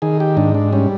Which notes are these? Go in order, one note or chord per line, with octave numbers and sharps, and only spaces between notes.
D#3 G#4
G4
G#2 D4
D4
G3 C#4